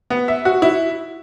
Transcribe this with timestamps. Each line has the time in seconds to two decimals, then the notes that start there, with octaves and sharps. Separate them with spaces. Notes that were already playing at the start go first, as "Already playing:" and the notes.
0.10 B3
0.28 E5
0.45 F#4
0.62 E4